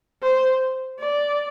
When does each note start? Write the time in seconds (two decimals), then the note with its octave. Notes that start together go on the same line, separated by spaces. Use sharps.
0.23 C5
1.00 D5